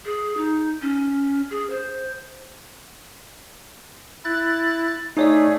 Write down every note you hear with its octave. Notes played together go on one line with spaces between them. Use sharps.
G#4
D#4
C#4
G#4
C5
E4 F#6 A6
A3 D#4 G#4 C#5 D5